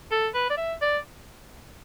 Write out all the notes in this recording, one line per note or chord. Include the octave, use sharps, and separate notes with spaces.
A4
B4
D5
E5
D5